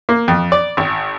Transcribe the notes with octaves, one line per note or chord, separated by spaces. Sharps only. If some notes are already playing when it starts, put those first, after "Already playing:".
A#3
F2
D5
G#1